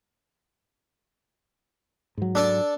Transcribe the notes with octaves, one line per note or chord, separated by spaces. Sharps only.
G#2 F#3
D4 A4 D5